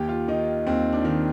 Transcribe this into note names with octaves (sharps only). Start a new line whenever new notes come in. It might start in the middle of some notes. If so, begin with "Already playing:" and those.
Already playing: D#2 G4
F4
D#3 D#4
D#2 C4
D4
D#3